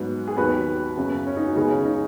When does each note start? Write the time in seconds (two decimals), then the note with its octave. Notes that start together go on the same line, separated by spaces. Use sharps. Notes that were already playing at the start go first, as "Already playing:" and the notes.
Already playing: G#2 F#3 B3
0.27 G#4
0.37 D#2 D#3 F#3 B3 F#4 B4
0.97 F#2 C#3 B3
1.27 C#4
1.37 D#4
1.46 F#4
1.56 C#2 C#3 G#3 B3 D#4 G#4
1.71 C#4
1.86 D#4